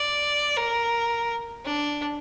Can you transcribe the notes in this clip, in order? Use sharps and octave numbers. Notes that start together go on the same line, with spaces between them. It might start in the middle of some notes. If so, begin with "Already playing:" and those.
Already playing: D5
A#4
D4